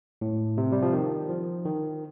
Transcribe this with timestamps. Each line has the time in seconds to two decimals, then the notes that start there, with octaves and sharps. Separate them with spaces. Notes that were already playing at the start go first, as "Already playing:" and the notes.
0.21 A2
0.58 C3
0.72 G3
0.82 F3
0.93 D#3
1.29 F3
1.65 D#3